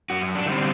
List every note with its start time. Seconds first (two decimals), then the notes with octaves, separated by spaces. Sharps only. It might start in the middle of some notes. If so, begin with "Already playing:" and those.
0.10 F#2 F#4
0.35 D4
0.46 D3 G3 C4 D#4